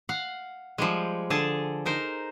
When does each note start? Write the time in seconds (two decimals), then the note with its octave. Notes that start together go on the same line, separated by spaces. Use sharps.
0.09 F5 F#5
0.78 F3 G3 G#3
1.30 D3 G#4 A4 A5
1.85 D#4 A#4 C5